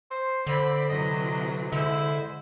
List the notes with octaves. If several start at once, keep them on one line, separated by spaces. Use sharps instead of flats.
C5
D3 C4 D5 B5
C3 E3 F#3 D#5
D3 G#3 E4 C5